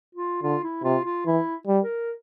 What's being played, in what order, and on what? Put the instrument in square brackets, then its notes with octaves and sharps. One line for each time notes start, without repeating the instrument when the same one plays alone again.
[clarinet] F4
[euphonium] D3 [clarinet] F4
[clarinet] E4
[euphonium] C3 [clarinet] F4
[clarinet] F4
[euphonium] E3 [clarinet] E4
[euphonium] G3
[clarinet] A#4